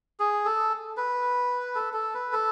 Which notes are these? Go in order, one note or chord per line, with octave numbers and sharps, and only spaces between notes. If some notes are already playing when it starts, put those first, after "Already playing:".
G#4
A4
B4
A4
A4
B4
A4